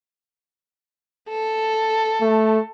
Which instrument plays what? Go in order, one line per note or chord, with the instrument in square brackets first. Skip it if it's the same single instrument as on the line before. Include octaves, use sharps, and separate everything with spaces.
[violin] A4
[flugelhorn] A3